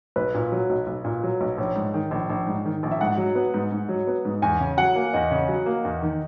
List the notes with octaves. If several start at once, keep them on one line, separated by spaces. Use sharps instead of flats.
B1 B4
A#2
F#3
B1
B1
A#2
F#3
B1
A#1 C#5
G#2
D#3
A#1
A#1
G#2
D#3
A#1
E5
G#2 F#5
F#3
B3
G#2
G#2
F#3
B3
G#2
E2 G#5
C#3
F#3 F#5
A#3
E2 D#5
C#3
F#3
A#3
E2
D#3